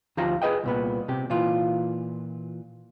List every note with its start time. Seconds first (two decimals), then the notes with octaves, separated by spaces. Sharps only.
0.17 D2 F3 D#4 F4 G4 A#5
0.42 G#4 B4 D#5 G5
0.64 C2 A#2 B3
1.08 C3 G4
1.30 A#2 E3 F4